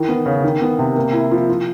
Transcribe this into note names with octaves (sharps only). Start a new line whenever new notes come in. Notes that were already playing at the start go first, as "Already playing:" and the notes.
Already playing: D#3 E3
B3
C#3
D#3
B3
C3
A#3
E4
F3
F3